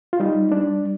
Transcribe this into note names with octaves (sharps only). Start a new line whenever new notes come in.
F4
G3 D#4
G3 D4